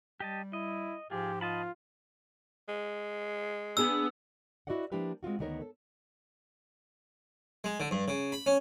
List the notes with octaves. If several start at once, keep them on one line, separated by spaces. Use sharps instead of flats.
G3 G4 D#5 A5
E4 D#5
G#2 F3 F4 G4 G#4
F4 D#5 A5 B5
G#3
B3 D4 G#4 E6
E4 F#4 B4 D5 D#5 F#5
F3 A#3 D4 E4 G4 B4
G#3 C4 F4 F#4
D2 D#3 B3 D#4 A#4 C#5
A4
G#3
D3
G2
C#3
B5
C#4